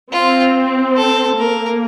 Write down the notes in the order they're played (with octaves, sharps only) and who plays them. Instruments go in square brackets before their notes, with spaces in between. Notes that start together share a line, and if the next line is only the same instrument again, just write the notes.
[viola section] C4 [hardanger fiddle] F4
[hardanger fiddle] A4
[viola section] A#3 [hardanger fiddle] A#4